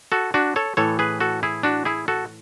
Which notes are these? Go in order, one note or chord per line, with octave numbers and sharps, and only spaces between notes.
F#4 A4
D4 F#4
A4 C#5
A2 E3 A4 C#5
G#4 B4
F#4 A4
E4 G#4
D4 F#4
E4 G#4
F#4 A4